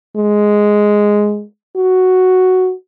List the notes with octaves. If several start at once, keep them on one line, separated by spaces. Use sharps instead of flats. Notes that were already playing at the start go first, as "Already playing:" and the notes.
G#3
F#4